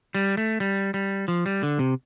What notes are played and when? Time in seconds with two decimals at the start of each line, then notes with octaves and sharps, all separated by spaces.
0.15 G3
0.37 A3
0.60 G3
0.94 G3
1.28 F3
1.46 G3
1.63 D3
1.79 C3